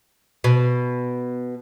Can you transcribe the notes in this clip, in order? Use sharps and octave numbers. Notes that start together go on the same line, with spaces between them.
B2